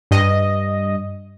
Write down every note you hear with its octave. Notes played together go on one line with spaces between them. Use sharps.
G2 D#5